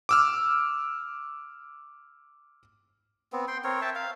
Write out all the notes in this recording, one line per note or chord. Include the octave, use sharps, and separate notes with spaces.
D6 E6 F6
B3 C4
G5 C6
C4 A#4 C#5
E5 G5 A5
F5